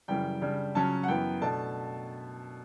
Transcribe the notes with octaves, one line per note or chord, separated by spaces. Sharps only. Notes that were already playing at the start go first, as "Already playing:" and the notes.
F#2 C#3 E3 G3 G5
C#3 G3 D4
C#3 F#3 C#4 A5
F#5
F#2 E3 B3 G5
B2 A3 D4 A5